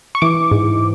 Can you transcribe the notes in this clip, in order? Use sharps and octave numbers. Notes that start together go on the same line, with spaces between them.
C#6
E3 D6
G#2